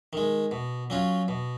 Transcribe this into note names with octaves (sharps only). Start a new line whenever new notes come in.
D#3 G#3
B2
F#3 C#4 F4
B2